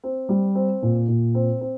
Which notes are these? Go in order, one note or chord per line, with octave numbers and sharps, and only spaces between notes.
C4
G3
C4
A#2
A#2
C4
C4